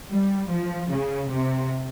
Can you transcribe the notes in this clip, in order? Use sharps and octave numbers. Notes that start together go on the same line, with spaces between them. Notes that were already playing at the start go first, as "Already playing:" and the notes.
G3
F3
C#3
C3